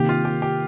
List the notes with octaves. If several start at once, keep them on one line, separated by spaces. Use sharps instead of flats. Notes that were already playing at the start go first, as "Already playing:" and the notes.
Already playing: C3 D#3 A#3 G4
F4
G4
G4